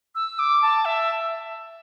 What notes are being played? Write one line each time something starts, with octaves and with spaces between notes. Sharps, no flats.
E6
D6
A5
E5